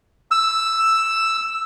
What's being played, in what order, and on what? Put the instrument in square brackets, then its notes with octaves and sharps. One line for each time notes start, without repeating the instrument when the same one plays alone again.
[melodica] E6